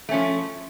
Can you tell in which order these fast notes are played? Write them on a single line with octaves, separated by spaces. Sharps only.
A3 C#4 F3